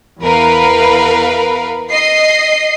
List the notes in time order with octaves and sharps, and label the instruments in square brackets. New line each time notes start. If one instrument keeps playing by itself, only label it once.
[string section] E2 A#4 B4 F5
D#5 C7